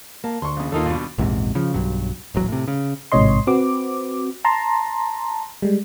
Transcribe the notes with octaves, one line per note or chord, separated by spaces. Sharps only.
A#3 A5
D2 C6 C#6
A#1 C#3
D#2 A#3 D#4 F4 A4
G2 B2
A#1 E2 G#2 C3
C#3 F3
B1 G2 F#3
D#1 A1 F#3
A2 C3
C#3
A1 G#2 C3 C#5 D#5 C6
C4 F#4 B4 D6
A5 A#5 C6
G3 G#3